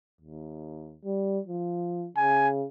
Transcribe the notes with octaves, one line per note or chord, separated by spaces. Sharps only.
D#2
G3
F3
C#3 G#5